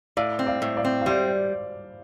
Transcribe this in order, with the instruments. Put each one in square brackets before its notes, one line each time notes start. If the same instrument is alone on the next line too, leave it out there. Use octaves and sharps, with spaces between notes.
[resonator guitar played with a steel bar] A2 [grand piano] D5 F5
[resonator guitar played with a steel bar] C4
[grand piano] D5 F5
[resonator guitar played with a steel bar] A2
[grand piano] D5 F5
[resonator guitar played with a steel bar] C4
[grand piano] F5
[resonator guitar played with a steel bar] G3 [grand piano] C5 E5